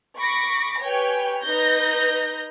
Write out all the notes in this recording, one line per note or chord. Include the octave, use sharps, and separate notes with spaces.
B5 C#6 D6 A#6
G4 B4 C#5 G5 G#5
D#4 B4 G6 A#6